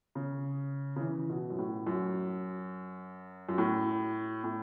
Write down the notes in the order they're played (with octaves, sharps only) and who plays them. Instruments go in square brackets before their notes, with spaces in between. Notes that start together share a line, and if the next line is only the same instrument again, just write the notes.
[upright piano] C#3
C#3
E3
B2
F#2
A2
F#2
F#2
A2
A2